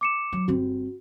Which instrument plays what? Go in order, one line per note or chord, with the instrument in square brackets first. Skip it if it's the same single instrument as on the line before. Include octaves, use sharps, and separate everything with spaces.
[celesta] D6 C#7 E7
[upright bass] F#3
[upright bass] G1 C4 [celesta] F#4